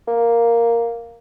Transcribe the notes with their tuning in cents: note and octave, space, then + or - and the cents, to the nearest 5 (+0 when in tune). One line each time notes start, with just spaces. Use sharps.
A#3 +0